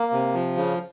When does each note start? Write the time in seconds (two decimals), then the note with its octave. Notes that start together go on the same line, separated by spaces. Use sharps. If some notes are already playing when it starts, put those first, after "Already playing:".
Already playing: A#3
0.12 C3
0.34 F3
0.56 C#3